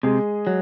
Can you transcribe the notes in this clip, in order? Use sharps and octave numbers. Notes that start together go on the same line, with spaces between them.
C3 G#3 G#4
F#3